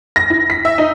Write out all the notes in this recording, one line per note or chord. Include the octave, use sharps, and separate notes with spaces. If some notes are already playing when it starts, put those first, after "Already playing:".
A#6
E4
B6
E5
D#4